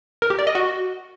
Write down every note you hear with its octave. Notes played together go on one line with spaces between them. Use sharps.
A#4
G4
D5
D#5
F#4